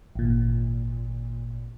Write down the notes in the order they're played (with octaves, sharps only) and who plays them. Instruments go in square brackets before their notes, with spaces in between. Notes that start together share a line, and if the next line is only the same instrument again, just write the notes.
[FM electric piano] G#1 A#2